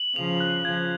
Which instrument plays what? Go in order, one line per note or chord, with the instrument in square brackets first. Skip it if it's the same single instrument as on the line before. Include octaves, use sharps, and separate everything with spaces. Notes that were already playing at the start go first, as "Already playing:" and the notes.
Already playing: [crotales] F#7
[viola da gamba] C#3 F3 [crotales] F7
[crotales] F#6
[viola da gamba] C#3 F3 [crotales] G#6